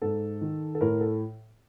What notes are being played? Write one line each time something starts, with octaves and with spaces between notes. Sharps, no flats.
G#2 A4
D#3
A4
A2 A#4
A4